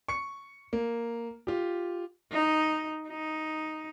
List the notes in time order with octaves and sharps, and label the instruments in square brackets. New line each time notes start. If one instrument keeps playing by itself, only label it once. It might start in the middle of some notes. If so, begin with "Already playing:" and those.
[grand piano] C#6 C#7
A#3
F4 G4
[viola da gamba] D#4
D#4